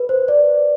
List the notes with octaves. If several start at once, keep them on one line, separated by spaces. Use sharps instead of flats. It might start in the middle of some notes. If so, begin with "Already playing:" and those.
Already playing: B4
C5
D5